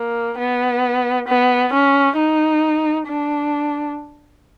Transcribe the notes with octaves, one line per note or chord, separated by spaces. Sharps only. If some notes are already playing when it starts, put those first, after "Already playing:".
Already playing: A#3
B3
B3
C#4
D#4
D4